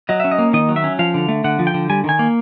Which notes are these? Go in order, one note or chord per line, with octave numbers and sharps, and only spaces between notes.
F#3 D#5
C#4 E5
D#5
A#3
D#3 D#5
F#3
E5
C#4
F3 F5
D3
A3
D3 F#5
F3
G5
D3
G3 G#5
D#3 G#5
A#3